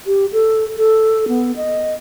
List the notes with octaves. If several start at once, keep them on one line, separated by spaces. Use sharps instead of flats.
G4
A4
A4
B3
D#5